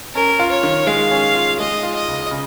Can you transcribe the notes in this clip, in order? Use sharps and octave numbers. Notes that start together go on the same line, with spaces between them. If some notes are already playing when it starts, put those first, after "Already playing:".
C#4 A#4
F4
C#5
D#3
G#3 F5
C#4
F4
G#3 D#5
F4
D#5
C#2
C#3